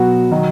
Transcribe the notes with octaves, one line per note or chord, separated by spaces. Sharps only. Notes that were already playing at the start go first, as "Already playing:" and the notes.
Already playing: B2 F#3 B3 F#4
D#3 F#3